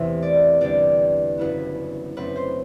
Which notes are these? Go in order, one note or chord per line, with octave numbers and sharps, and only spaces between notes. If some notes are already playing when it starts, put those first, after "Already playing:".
Already playing: E2 C3 E3 A3 E5
D5
E2 D3 G3 D4 D5
F#1 F#2 F#3 B3 E4 B4
F#2 F#3 A3 C4 B4
C5